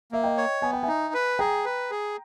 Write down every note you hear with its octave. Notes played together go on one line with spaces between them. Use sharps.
A#3 E5
D#5 G5
C#5
B3 G#5
G5
D#4 E5 G#5
B4
G#4 G5 A#5
B4
G#4